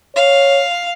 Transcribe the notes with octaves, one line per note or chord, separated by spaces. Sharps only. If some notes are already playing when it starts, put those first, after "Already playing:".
C#5 F5